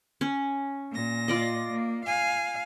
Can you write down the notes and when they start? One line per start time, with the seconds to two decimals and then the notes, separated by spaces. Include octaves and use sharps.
0.21 C#4
0.92 A#2 A#6
1.28 F4 D5 D#5
1.72 A#3
2.04 F5 G#5